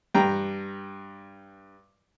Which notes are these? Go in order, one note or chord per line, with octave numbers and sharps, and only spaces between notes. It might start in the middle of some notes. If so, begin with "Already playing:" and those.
G2 G5 A#5